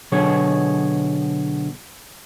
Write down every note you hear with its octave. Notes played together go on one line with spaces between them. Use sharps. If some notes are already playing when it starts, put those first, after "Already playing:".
B2 D3 F#3 G#4 C#5